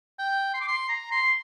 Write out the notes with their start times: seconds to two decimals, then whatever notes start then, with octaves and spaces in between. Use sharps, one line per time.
0.19 G5
0.54 C6
0.61 D6
0.68 C6
0.89 A#5
1.12 C6